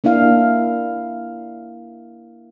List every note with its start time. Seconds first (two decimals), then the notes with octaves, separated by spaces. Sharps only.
0.04 A#3 D4 E4 F5